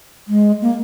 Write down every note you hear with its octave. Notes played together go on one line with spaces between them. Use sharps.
G#3
A#3